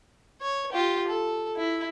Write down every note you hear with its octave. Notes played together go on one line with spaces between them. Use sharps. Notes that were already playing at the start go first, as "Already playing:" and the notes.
C#5
F4 G4
A4
E4